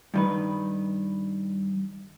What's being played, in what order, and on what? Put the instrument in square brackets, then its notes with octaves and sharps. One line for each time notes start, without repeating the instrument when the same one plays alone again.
[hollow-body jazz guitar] G2 D#3 B4